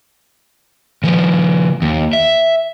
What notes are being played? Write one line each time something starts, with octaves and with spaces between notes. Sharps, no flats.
D#3 F3
D#2
E5